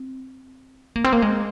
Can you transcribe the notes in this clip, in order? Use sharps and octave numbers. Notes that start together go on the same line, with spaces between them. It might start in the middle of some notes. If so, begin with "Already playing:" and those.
Already playing: C4
A#3
C4
A#3
G#3